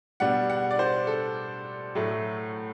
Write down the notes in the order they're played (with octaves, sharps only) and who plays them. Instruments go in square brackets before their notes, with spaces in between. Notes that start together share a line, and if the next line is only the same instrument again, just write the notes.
[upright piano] B2 G3 D4 F#5
F#5
D5
C5
A4
A2 F#3 A3